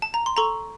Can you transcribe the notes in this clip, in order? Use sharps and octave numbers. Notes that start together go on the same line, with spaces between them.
A5
A#5
C6
A4 A#5 C#6